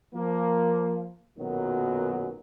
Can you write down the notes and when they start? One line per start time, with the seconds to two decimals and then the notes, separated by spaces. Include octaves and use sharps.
0.14 F3 A#3
1.38 B1 F#2 A#2 D#3 F#3 B3